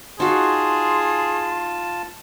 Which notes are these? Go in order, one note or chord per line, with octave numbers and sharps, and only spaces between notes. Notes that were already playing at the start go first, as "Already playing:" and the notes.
D#4 F4 F#4 G#4 A5 C6